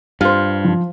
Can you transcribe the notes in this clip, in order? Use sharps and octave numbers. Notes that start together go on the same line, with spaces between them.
G2 F4 C5
F3